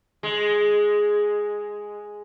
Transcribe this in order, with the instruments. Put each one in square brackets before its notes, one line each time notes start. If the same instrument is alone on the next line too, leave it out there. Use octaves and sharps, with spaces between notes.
[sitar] G#3